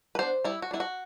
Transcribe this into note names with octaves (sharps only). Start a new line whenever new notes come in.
B4
B3 D4 C5
G3 E4
F#4
B3 D4 E4
F#4